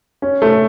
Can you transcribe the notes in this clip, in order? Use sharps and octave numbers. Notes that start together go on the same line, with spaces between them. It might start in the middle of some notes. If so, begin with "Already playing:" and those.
C#4
A3